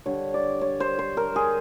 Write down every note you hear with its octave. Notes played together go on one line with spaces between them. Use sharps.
D3 G3 C#5
D5
C#5
C5
C5
A#4
G#4